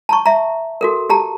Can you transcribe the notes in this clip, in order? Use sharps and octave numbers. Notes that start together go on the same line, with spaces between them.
A5 A#5 C#6
E5 A#5
F#4 A4 A#4
G4 A5 A#5